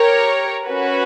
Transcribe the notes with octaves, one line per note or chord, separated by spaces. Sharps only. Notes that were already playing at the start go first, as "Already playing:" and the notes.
Already playing: G4 A#4 C#5
C#4 F#4 B4